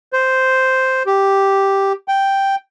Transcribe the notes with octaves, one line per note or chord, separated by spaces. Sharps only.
C5
G4
G5